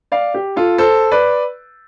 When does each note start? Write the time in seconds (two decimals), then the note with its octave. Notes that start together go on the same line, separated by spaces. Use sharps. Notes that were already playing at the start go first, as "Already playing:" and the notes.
0.12 D5 F5
0.34 G4
0.56 F4 A4
0.78 A4 C5
1.11 B4 D5